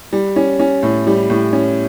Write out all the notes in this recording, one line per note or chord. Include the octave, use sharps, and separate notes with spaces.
G3
C#4
C#4
A2
G3
A2
C#4